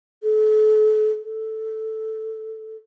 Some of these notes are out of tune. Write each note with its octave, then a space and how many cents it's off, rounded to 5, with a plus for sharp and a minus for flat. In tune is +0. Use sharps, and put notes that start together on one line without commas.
A4 -40
A4 +0